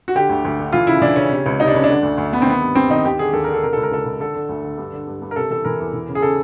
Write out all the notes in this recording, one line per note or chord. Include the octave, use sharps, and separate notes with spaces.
F#4
D3 G4
D2
D2
D3
E3 F4
C#3 E4
E3 D4
C#3 C#4
C3
C#2
C3 D#4
D4
C#2 C#4
D4
D3
D2
D2
D2 B3
C4
D#3 B3
G2
G2 C4
D#3 D#4
D#2 G4
D3 G#4
D#2 A4
D3 A#4
A4
C3 A#4
C#2 A4
A#4
C#2 A4
C#2
D3 A4
D3
D2
D3
G2
D3
G2
G2
A#4
C3 A4
E3 A4
E3 A#4
E2
E3
C#3
G#4
C#3 A4